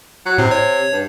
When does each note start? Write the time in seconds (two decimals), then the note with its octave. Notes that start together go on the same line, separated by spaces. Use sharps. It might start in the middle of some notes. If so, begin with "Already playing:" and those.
0.26 F#3
0.38 A2 C3
0.51 C#5
0.92 G2